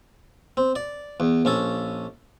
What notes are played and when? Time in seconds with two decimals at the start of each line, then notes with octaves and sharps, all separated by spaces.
0.57 C4
0.76 D5
1.20 E2
1.45 A#1 C#4 A4